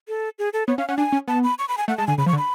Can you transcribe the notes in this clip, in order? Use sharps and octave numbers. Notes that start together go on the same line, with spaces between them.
A4
G#4
A4
B3 C#5
C#4 F5
C#4 F#5
D4 G#5
C#4
B3 A5
B5
C#6
B5
G#5
A3 F#5
G#3 A5
D3 G#5
C#3 B5
F3 C#6
D3
B5